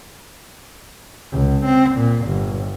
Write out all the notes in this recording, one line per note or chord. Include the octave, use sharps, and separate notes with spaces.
C#2
C4
A#2
G1